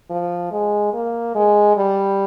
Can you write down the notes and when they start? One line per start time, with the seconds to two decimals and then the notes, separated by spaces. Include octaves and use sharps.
0.10 F3
0.52 G#3
0.93 A#3
1.35 G#3
1.77 G3